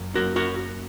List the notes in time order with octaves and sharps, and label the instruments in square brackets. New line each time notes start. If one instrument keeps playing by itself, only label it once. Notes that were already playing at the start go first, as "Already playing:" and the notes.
Already playing: [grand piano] F#1 F#2 F#3 A#3
[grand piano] F#1 F#2 F#3 A#3 [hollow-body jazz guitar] F#4 A#4
[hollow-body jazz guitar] F#4 A#4